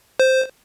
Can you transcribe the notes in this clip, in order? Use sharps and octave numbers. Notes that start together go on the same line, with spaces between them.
C5